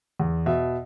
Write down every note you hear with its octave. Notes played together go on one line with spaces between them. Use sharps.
E2
B2 E5